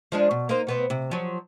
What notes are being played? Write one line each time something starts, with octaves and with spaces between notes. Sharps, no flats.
F3 G#3 D4
B2
A#3 D#4 C5
B2 B3 C4
C3
F3 F#3